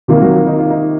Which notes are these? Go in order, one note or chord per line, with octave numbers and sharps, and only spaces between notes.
C3 D#3 A#3 F4
F#3 F#4
F4
D#4
F4
D#4